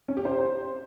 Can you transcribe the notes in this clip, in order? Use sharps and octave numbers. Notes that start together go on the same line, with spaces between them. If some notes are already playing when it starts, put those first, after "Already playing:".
C#4
G4
C5